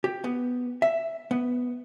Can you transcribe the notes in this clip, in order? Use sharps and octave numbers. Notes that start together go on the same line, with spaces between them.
G4
B3
E5
B3